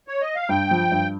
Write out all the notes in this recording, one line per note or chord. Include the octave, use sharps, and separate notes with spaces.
C#5
D#5
F5
G2 G5
F3
G2